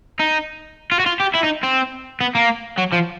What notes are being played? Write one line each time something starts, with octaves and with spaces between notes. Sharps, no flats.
D#4
F4
F#4
F4
G4
E4
D#4
C4
B3
A#3
F#3
F3